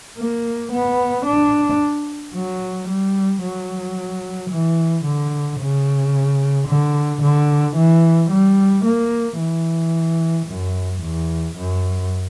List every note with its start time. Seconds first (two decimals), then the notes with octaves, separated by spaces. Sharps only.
0.18 A#3
0.72 B3
1.26 D4
2.34 F#3
2.88 G3
3.43 F#3
4.51 E3
5.05 D3
5.60 C#3
6.68 D3
7.22 D3
7.76 E3
8.31 G3
8.84 A#3
9.39 E3
10.47 F#2
11.01 E2
11.56 F#2